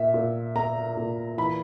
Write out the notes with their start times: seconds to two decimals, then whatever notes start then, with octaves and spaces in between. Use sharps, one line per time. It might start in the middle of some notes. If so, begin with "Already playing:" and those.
Already playing: A#2 E5
0.14 A#2
0.55 A#3 A#5
0.97 A#2
1.38 E3 B5